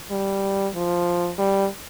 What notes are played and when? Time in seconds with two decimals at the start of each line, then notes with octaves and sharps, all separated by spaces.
0.11 G3
0.75 F3
1.38 G3